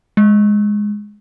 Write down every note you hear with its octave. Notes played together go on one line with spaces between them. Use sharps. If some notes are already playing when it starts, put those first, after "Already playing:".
G#3